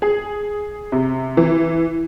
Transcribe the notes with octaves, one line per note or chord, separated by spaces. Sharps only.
G#4
C3
E3